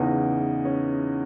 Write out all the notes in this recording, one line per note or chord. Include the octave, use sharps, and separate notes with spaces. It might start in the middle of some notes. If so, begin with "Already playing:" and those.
Already playing: E2 C#3 E3 D#4
C#4